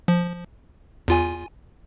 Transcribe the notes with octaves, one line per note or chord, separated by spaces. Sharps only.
F3
E2 F4 G#5